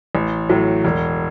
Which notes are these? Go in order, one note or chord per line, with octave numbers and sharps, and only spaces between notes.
A1
A2 F#3
E1